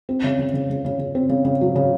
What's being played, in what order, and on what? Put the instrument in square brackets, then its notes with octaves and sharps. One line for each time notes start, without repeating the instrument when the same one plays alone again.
[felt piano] C4
C#3
C#3
C#3
C#3
C#3
C#3
C4
C#3
C#3
F#3
C#3